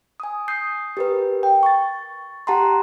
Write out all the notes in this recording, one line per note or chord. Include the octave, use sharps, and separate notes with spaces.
G#5 D#6
D#6 G6 C7
G4 A#4 B4
G5
C#6 A6
G4 F#5 A5 A#5 C6